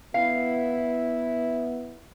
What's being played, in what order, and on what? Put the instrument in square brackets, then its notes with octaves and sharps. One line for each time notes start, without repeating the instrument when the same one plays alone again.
[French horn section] B3 E4 [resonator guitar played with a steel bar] F5